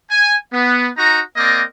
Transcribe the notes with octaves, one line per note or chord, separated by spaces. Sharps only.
G#5
B3
D#4 F#4 A#5
A#3 C4 A#4 D5 D#5